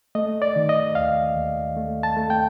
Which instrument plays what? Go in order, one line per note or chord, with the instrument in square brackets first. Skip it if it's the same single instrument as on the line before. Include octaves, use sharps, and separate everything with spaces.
[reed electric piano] A3 D#5
D5
D#3
D#5
D#2 F5
D#2
A3
A5
A3
G5